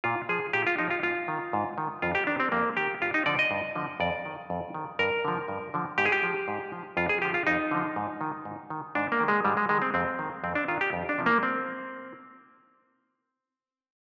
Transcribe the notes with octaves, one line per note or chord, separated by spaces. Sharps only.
A#2 F4
F3 G#4
A#2 G4
F4
F3 D#4
F4
G#2 F4
D#3
G#2
D#3
F2 F4
G4
D#3 D4
C4
F2 A#3
D#3 G4
G2 F4
D#4
D3 F3 D5
D#5
G2
D3 F3
F2 D5
D#3
F2
D#3
G2 A#4
D3 F3
G2
D3 F3
G#2 G4
G#4
G4
F3
G#2
F3
F2 F4
G#4
D3 F3 G4
F4
F2 D#4
D3 F3
G#2
D#3
G#2
D#3
G#2 D4
A#3
D#3
G#3
G#2 G3
G#3
D#3 G#3
C4
F2 C4
D#3
F2 C4
D4
D#3 F4
G4
F2
D4
C3 F3
A#3
C4